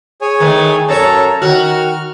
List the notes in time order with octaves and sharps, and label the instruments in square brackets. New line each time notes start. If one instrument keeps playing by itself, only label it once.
[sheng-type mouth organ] G#4 C#5 G#5
[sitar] D#3 E3 A3
[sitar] F#2 C#5 [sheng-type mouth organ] A4 A5 A#5
[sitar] D#3 F#4 [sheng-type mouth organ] F6